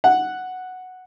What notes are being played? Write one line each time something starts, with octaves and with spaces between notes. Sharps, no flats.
F#5